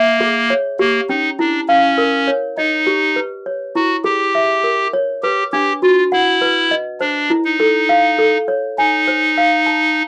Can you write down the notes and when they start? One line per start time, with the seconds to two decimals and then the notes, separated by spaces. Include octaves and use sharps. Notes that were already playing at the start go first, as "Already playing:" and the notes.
Already playing: A#3 E5
0.21 G#4
0.50 C#5
0.79 A#3 G4
1.09 C#4 D#4
1.39 D4 E4
1.68 C#4 F5
1.98 A#4
2.28 C#5
2.57 D#4 D#5
2.87 G4
3.16 B4
3.46 C#5
3.75 E4 F#4
4.04 G4 G#4
4.35 E5
4.64 A#4
4.93 C#5
5.23 G4 B4
5.52 D4 G4
5.82 F4 F#4
6.12 E4 F#5
6.41 B4
6.71 D#5
7.01 D4 C5
7.30 E4
7.44 D#4
7.60 A4
7.89 F5
8.19 A4
8.48 C#5
8.78 D#4 G#5
9.08 C5
9.38 F5
9.66 A5